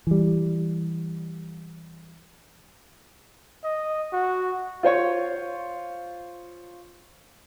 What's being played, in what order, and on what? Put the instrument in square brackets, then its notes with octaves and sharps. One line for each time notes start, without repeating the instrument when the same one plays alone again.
[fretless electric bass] E3 G3
[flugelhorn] D#5
F#4
[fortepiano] F4 C5 C#5 C#6